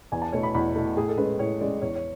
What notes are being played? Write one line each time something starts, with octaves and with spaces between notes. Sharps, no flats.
E2 G#5
A5
B2 A3 E4 C#5
B5
E2 B5
B2 A3 E4
A2 G#4
A4
G#3 C#4 B4
A2 C#5
G#3 C#4 D5
E2 C#5
C#5